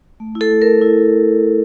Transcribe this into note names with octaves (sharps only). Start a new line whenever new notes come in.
A3
E4
A4
A3
A3 A#4
E4
A3